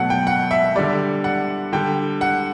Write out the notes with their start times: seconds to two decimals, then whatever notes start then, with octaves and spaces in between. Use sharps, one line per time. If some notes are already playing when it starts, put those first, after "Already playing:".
Already playing: B2 F#3 A3 F#5
0.10 G5
0.27 F#5
0.51 E5
0.75 D3 G3 D5
1.24 F#5
1.73 D3 G3 G5
2.21 F#5